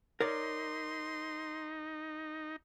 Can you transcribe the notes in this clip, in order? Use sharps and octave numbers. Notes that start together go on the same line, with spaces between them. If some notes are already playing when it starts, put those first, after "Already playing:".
D#4 A#4 C#5 D5 C6